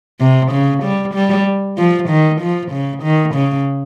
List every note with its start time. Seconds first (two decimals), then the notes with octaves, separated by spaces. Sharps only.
0.20 C3
0.52 C#3
0.83 G3
1.14 G3
1.78 F3
2.09 D#3
2.41 F3
2.72 C#3
3.03 D#3
3.35 C#3